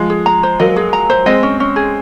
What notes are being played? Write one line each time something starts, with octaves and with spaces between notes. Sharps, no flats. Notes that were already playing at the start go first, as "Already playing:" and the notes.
Already playing: F3 G#3
G#4
A#5
C5
F#3 A#3 D#5
G#4
A#5
C5
G#3 C4 D#5
C#4
C#4
G#4